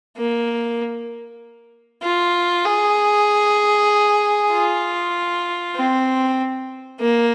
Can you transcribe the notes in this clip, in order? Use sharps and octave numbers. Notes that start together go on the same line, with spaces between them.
A#3
F4
G#4
F4
C4
A#3